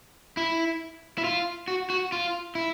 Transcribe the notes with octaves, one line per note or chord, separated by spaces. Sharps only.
E4
E4
F4
F#4
F#4
F4
E4